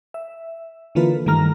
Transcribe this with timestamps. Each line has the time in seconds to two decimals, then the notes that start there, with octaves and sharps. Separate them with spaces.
0.14 E5
0.95 D3 E3 A#3 F4 A4 B4
1.26 G2 D#3 G3 A3 A#5 F6